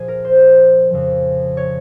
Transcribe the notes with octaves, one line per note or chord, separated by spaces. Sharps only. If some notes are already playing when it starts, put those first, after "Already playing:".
Already playing: A#2 F3 G#4
A#4
C5
F2 C#3 F3
C#5